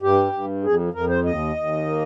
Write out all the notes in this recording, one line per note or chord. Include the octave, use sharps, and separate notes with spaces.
G2 G4
G2
F2 G#4
F2 A#4
C5
D#2 D#5
D#2
A#3